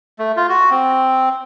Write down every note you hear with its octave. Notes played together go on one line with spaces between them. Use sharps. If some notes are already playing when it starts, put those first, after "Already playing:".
A3
F4
F#4
C4